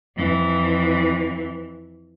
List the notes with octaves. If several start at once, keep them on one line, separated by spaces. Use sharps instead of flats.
F2 E3